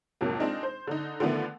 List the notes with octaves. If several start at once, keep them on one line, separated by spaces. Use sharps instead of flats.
F2 G#2 C3 F#3 A#3
G#3 C4 D4 D#4 F4
C5
D3 D#4
D3 D#3 F3 A3 B3